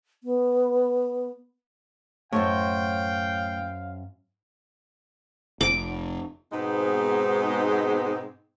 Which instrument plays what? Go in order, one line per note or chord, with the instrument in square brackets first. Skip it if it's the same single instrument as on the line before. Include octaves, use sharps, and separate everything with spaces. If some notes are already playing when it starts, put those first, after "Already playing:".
[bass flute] B3
[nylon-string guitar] F#2 C5 C#5 [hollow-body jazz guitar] A2 [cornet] F5 [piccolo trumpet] G5
[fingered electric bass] F1 [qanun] D6
[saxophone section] G#2 B2 G#3 B3 C4 D#4